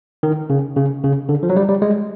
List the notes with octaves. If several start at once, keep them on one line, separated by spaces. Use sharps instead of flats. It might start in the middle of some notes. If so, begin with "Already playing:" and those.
D#3
C#3
C#3
C#3
D3
F3
F#3
G3
G3
G#3